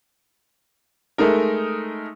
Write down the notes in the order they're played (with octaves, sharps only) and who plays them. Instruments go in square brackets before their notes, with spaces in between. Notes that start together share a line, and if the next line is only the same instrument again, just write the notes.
[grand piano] G#3 A3 D#4 A#4